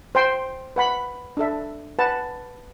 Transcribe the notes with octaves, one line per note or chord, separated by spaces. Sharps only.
C5 G5 C6
B4 F#5 B5
D4 A4 E5
B4 F#5 A5